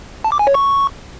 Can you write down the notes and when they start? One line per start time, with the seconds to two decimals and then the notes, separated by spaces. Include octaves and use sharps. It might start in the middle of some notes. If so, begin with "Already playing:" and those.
0.24 A5
0.32 D6
0.39 G#5
0.47 C#5
0.54 C#6